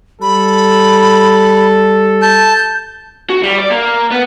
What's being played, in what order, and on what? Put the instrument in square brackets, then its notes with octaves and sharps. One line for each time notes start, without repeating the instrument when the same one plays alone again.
[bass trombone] G3 [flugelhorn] A4 [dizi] B5
[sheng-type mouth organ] A5 [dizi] G6
[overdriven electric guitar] F#4
G3
D5
A#3
B3